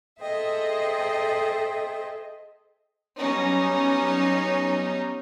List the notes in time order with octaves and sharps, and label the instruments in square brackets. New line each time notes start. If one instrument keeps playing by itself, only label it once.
[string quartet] G#4 A4 C5 D#5 E5 G5
[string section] F#3 G3 B3 C#4 D#4